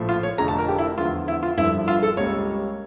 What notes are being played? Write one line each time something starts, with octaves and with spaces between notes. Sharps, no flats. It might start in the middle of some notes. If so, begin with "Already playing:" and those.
Already playing: A#1 A2 F3 A3
F4
C#5
F1 F2 D3 A3 A#5
A5
A#4
G4
E4
E2 D3 F3 A3 F4
E4
F4
G1 G2 F3 E4
F4
A4
C#2 C#3 G3 A#3 C#5